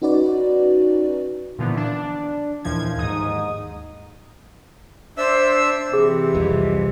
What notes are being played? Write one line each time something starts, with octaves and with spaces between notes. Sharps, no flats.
C#4 D#4 F#4 B4 D5
A#2 D3 E3 F3 B3
D4
D#2 A#2 E3 F3 G#6
D#2 G#2 D#4 D#6
D4 C5 E5 E6
C3 E3 G#4
C2 F2